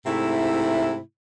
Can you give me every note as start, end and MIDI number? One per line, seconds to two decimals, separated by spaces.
0.06 0.99 44
0.06 0.99 48
0.06 0.99 57
0.06 0.99 64